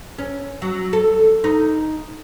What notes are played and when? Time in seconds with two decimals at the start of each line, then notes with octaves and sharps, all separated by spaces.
0.18 C#4
0.62 F#3
0.93 A4
1.44 D#4